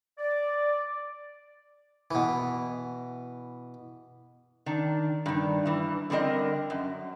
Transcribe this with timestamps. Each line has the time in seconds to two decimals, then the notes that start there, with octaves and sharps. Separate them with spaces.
0.18 D5
2.11 B2 E3
4.66 D#3 D4
5.26 G2 D#3
5.66 G2 E3
6.10 D3 G3 C4 A#4 D#5
6.70 F#2